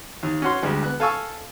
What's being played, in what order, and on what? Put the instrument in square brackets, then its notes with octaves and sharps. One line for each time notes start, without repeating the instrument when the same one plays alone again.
[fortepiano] D#2
C#4 F#4 C6
D2 G3 G#3
B3 F#6
A4 F5 G#5 A5 C#6 E6